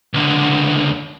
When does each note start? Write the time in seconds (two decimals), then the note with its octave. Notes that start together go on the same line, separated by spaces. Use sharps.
0.14 C#2 D3